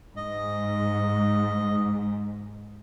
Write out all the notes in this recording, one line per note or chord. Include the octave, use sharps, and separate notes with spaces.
G#2 D#5